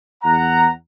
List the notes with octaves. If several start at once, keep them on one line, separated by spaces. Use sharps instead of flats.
E2 F#5 A#5